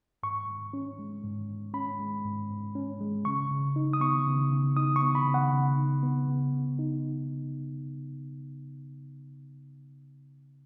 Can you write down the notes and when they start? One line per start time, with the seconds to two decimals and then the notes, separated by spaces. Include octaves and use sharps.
0.23 G#2 C#6
0.48 G#2
0.73 C#4
0.99 G#3
1.24 G#2
1.49 G#2
1.74 C#4 B5
2.00 G#3
2.25 G#2
2.50 G#2
2.75 C#4
3.01 G#3
3.25 C#3 C#6
3.51 C#3
3.76 D#4
3.93 D#6
4.01 B3 C#6
4.27 C#3
4.51 C#3
4.76 D#4 D#6
4.96 C#6
5.02 B3
5.15 B5
5.28 C#3
5.34 F#5
5.52 C#3
5.78 D#4
6.03 B3
6.28 C#3
6.53 C#3
6.79 D#4